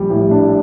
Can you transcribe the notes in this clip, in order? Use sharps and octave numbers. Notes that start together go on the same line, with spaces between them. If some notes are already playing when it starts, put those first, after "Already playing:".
Already playing: A#1 G3
A2
D4